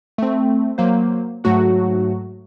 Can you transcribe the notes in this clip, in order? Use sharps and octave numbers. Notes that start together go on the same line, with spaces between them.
A3 C4
F#3 A#3 C5
G#2 F#3 A3 F#4 F#5